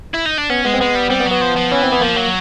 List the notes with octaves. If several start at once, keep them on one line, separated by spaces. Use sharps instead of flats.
E4
D#4
D4
B3 C#4
G#3 B3
C4
G#3 B3
G3
G3 C4
B3
F#3
B3
F3
F3
E3 C#4
C4
B3
F3 A#3
F#3